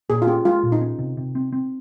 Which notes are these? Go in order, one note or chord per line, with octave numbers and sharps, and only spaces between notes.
A#2 G#4
F4
C#4 G4
G#3 F4
A#2
D#4
C#4
C3
C3
C4
C4